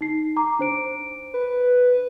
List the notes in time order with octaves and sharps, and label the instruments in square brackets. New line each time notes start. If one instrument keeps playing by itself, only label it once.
[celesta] D#4 C7
A#5 D6
D4 C5 D7
[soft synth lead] B4